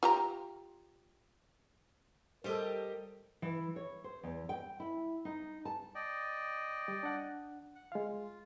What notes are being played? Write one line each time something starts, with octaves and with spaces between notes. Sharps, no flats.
F4 G4 A#5
G3 G4 A4 A#4 C5 D#5
E3
C#5
C5
E2
G5
E4
D#4
A5
D5 D#5 G5
G3
D4 F#5
F#5
G#3 F4 F5